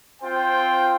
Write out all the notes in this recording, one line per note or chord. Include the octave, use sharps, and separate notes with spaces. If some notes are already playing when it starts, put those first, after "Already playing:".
C4 F4 C5 G5